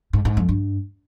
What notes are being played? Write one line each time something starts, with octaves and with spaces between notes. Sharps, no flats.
G#2
G#2
F2
G2